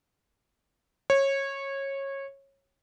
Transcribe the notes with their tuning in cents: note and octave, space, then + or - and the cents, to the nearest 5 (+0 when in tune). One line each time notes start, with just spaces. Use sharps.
C#5 -20